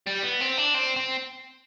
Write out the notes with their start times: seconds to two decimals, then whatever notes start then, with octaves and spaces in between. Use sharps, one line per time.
0.07 G3
0.23 B3
0.40 C4
0.57 D4
0.74 C4
0.97 C4